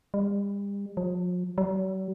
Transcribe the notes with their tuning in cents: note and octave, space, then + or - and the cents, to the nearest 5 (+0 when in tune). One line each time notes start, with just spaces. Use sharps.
G3 +40
F3 +45
F#3 +45